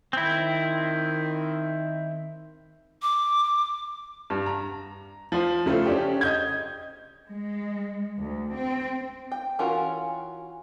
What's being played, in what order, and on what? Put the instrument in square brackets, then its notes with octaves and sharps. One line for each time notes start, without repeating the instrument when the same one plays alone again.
[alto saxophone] D#3 [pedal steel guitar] C4 E4
[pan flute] D6
[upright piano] G2
A#5
F3 F4 C5
C#3 A3 F4 C5
C#4 D4 G4
D#5 G6 G#6
[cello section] G#3
D2
C4
[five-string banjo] G5
E3 C#4 F4 F#4 A#4